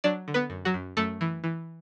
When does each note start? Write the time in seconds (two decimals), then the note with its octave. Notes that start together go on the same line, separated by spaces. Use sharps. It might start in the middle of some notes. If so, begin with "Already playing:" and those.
0.04 F#3 D4 D5
0.28 D3
0.34 B3 B4
0.50 F#2
0.65 F#3 F#4
0.74 F#2
0.97 F#2 A3 A4
1.21 E3
1.44 E3